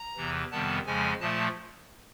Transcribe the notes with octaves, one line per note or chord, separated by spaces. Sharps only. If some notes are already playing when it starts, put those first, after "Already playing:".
Already playing: A#5
E2 C3 E3
F2 C3 D#3 G3 B3 A5
F2 C#3 F3 G#3 G#5
A#2 F3 A3 A5